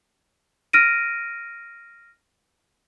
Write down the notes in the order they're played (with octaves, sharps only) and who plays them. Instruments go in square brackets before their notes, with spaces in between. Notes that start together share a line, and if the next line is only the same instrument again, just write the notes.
[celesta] F6 A#6 D7 D#7